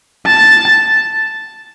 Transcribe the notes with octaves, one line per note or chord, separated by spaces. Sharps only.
A5